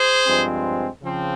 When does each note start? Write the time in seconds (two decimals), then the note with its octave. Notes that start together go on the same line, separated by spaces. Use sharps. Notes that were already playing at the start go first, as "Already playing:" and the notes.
Already playing: G#4 C5
0.26 G2 F3 G#3 C4
1.02 C#3 F3 C4